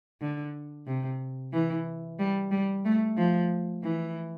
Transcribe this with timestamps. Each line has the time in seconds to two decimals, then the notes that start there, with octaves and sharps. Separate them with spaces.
0.21 D3
0.87 C3
1.53 E3
2.19 G3
2.51 G3
2.85 A3
3.17 F3
3.83 E3